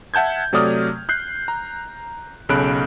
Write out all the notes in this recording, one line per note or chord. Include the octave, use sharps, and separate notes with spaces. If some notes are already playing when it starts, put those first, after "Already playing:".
E5 F#5 A5 G6 G#6
C3 F#3 A3 D5 D#6 F6
F#6 G6 C7
A#5
B1 C#3 A4 B5 F#6 D7